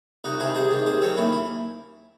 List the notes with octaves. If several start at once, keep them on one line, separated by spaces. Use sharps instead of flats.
C2 D#4 F#4
C3 D#3 E4 G#4
C2 G#4 C5
C3 D#3
D#2 G#4 C5
D#3 F#3 C4 A4 C#5
D#2 C#4 E4
E4